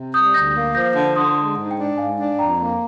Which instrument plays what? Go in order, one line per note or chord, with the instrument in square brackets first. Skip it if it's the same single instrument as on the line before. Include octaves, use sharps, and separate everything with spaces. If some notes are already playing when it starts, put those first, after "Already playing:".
Already playing: [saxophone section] C3
[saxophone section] G3 [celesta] D#6 G6
[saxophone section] D2 [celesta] G6 A#6
[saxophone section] A#3
[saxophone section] F3 [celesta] G6 A#6
[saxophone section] D3
[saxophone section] D3 [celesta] C6 D#6
[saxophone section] G#3
G#2
[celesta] G5
[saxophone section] D4
[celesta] G5
[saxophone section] G#2 [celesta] F5 G#5
[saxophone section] D4
[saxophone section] F2 [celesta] G5 A#5
[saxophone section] A#3